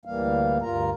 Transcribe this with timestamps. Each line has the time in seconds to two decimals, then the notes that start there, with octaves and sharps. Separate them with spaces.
0.05 D2 A2 E3 G3 A#3 F5
0.62 D2 G2 F4 A#4 A#5